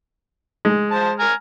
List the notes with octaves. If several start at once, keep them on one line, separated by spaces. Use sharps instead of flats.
G#3
C5 A5
G#5 A#5 F6